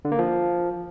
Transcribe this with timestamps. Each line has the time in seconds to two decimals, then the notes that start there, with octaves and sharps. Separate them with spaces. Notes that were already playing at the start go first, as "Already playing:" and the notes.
0.05 D3
0.12 A#3
0.19 F3